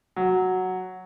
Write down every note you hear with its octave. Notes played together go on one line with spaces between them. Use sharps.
F#3